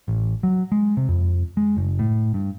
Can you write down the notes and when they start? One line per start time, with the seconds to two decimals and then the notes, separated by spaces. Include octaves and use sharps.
0.08 A1
0.43 F#3
0.72 G#3
0.97 C3
1.09 F2
1.57 G#3
1.76 F#1
1.99 A2
2.34 G2